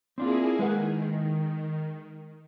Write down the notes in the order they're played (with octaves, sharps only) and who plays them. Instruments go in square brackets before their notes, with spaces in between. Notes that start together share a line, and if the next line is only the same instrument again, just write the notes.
[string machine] A#3 E4 G#4 [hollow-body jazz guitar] C4 D4 F4
[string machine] D#3 [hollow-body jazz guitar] G#3 B4 F#5